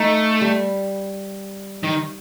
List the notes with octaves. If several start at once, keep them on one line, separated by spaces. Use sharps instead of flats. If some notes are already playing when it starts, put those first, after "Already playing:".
Already playing: A3 D#4
G3
D#3